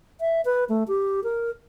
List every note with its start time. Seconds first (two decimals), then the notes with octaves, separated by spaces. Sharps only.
0.20 E5
0.45 B4
0.69 A3
0.88 G4
1.24 A#4